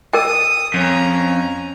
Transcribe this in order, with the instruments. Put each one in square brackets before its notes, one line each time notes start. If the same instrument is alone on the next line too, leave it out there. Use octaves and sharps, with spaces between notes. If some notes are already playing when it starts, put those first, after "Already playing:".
[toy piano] A#4 G5 [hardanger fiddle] D#6
[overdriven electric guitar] F2 [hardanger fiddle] C#4 A#5